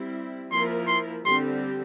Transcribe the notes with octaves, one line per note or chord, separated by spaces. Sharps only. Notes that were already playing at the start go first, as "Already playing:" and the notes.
Already playing: G3 C4 E4
F3 A#3 E4 A#4 C6
C6
D3 G3 C4 G4 C6